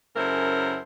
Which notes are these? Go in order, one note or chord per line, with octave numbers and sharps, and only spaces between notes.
F#2 C#3 E4 A4 A#4 C5